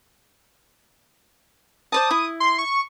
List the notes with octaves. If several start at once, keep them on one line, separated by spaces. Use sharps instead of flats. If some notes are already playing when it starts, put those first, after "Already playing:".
C5 D5 A5 D#6
E4
C6
C#6